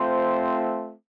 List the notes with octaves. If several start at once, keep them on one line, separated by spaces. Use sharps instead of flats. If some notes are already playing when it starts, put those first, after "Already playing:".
Already playing: A3 C4 F4 C5